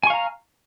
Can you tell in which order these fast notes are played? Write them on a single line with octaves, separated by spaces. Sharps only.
G#5 C#6 F5 A#5